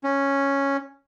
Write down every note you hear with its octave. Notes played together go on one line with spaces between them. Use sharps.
C#4